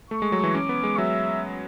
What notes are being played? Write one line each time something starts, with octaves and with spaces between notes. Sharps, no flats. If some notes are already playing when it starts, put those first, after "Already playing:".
A3 C#6
G#3
F#3
E3
C#4 D6
B3
G#3
F#3 E5